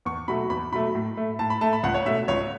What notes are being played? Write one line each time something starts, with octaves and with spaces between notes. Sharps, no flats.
E2 C#6
B2 F#3 A3 B5
E2 B5
B2 F#3 A3 B5
A2
A3
A2 A5
B5
A3 A5
B5
C#2 F#5
C#5
B2 A3 E5
C#2 C#5